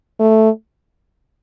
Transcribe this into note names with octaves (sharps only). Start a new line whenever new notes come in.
A3